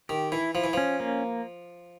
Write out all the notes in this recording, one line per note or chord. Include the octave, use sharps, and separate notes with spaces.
D#3 G4
E3 E4
F3 E4
E3
F3 C#4
A#3